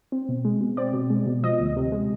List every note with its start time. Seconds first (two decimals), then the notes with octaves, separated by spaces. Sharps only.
0.12 C4
0.29 B2
0.45 G#3
0.61 B2
0.77 C4 D5
0.94 B2
1.10 G#3
1.26 B2
1.43 F3 D#5
1.60 D2
1.76 C3
1.92 G#3